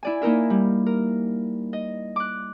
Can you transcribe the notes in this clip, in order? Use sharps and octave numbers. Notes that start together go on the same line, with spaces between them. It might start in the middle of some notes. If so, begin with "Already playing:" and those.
E4 D5 G#5
A#3 D#4 E4 A#4 E5
G3
A#4
D#5
D6 F#6